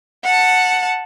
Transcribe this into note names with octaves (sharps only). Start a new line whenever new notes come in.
F#5 A5